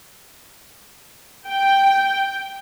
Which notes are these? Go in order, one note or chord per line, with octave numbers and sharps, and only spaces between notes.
G5